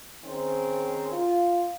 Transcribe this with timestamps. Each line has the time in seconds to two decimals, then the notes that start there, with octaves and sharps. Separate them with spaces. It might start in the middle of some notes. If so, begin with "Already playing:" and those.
0.24 D#3 C4 C#4 G#4 C5
1.12 F4